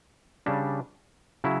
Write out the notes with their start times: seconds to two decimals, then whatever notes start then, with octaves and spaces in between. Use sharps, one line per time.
0.46 C#3 G3 D4
1.44 C#3 F#3 E4